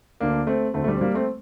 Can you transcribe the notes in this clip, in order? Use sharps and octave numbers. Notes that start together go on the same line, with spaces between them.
D2 D3 A#3 D4
A3 C4
D2 D3 A3 C4
A3
G3
C4
G3 A#3
A3 C4